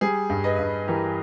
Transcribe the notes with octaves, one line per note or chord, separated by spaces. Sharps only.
G3 G#4
G2
B4 D#5
G2
E3 G4 A#4